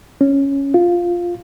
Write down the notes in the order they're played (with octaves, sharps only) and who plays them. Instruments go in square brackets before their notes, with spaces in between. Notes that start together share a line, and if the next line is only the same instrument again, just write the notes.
[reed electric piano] C#4
F4